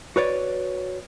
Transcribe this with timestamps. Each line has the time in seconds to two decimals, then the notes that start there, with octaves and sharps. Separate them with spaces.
0.16 F#4 B4 C#5 D5